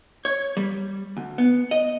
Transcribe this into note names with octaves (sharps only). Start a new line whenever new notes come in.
C#5
G3
D2
B3
D#5